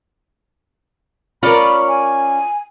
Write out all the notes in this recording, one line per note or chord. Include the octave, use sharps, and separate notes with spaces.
C#4 F4 A#4 D5 B5
G#5